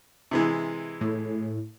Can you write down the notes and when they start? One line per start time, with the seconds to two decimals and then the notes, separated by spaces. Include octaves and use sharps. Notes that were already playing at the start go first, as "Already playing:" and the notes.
0.31 C3 E3 G#3
1.01 A2